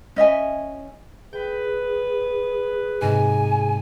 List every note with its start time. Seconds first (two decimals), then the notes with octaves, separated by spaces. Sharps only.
0.16 C#4 D#5 E5 G#5
1.33 G#4 B4 G5
3.01 G#2 C3 G#5 A#6